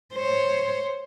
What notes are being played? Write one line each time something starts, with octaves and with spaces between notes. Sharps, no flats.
C5 C#5